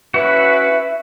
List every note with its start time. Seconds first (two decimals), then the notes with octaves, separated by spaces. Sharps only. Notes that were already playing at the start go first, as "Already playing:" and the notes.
0.14 C#4 E4 F#4 B4 E5